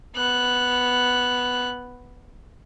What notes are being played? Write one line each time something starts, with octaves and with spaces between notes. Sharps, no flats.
B3 F#6